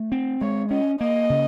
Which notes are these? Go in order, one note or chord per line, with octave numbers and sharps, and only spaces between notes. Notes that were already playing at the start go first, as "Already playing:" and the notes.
Already playing: A3
C4
G#3 C#5
C#4 D#5
A#3 D#5
C#3